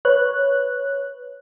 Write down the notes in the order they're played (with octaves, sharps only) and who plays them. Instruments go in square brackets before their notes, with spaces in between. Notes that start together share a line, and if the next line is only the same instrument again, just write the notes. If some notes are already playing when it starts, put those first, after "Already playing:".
[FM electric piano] B4 C#5 F#6